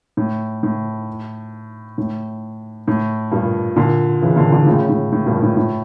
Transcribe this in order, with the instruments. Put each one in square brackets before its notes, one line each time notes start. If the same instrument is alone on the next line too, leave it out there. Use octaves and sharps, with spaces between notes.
[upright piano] A2
A2
A2
A2
G2 A#2
A#2 D3
C#3 E3
A#2 D3
A#2 D3
A2 C#3
A2
A2
G2 A#2
A2
A2